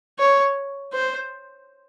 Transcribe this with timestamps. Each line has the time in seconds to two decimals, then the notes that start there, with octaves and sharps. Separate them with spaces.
0.19 C#5
0.93 C5